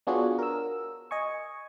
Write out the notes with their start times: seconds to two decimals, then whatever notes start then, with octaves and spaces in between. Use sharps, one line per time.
0.07 B3 D4 F4 F#4 G#4 C#5
0.39 A#4 E6
1.11 D#5 G#5 C#6